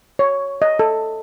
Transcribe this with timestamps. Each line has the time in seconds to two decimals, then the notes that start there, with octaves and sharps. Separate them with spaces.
0.19 C#5
0.62 D#5
0.79 A4